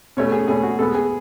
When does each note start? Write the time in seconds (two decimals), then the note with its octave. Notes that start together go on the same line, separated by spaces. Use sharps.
0.17 B2 A3 C#4 C#5
0.32 G#4
0.48 B2 A3 C#4 G#4
0.63 F#4
0.79 B2 G#3 B3 A4
0.95 G#4